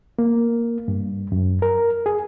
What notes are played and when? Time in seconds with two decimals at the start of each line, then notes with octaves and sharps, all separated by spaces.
0.19 A#3
0.88 G2
1.32 F#2
1.62 A#4
2.06 G#4